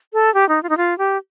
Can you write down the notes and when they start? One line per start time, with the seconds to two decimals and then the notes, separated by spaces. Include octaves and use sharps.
0.13 A4
0.34 G4
0.49 D#4
0.63 F4
0.69 D#4
0.77 F4
0.98 G4